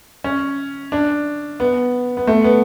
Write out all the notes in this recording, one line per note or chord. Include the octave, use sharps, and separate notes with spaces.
C#4
D4
B3
B3
A3
B3